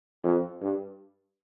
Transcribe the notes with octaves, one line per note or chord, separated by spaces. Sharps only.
F2
G2